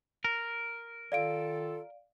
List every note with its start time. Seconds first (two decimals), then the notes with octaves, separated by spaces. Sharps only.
0.25 A#4
1.12 D#3 F4 A4 D5 F5 D7